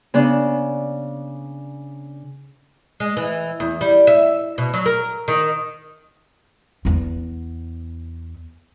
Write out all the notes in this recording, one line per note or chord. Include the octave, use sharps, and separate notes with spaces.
C#3 B3 D4
G#3
E3
E2
G3
E5
B2
F#3
A#4
D#3
E2 B3